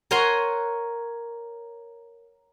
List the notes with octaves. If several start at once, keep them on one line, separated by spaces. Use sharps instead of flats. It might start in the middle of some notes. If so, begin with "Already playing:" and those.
A#4 C#5 F#5 G#5 A#5 C6